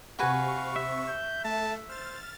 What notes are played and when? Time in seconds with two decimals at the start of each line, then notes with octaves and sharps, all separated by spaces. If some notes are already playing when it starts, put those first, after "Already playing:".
0.19 C3 F#4 B4 F5 G#5 C#6
0.76 E5
1.08 G6
1.44 A3 A5
1.89 C5 F6 A6